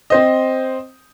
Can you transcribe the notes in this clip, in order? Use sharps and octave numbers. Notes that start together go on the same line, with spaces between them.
C4 C5 D#5